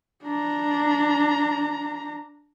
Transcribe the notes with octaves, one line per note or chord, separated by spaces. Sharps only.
D4 A#5